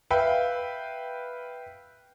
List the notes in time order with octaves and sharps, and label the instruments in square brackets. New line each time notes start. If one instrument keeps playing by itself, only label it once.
[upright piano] B4 E5 F5 G5